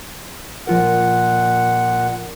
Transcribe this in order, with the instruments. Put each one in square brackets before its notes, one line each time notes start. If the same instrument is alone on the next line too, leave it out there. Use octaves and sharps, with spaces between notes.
[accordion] A#2 F#5 [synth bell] F3 F4 A#4